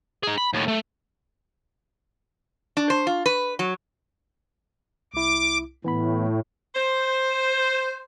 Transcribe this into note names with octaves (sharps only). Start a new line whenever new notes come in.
D#4 G#4
B5
D#2 A2
A3
D4
C5
F4
B4
F#3
C2 E4 D6
A2 E3 B3 B5
C5